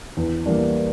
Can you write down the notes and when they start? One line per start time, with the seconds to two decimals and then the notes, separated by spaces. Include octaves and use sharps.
0.17 E2
0.46 E3 G3 A#3 D4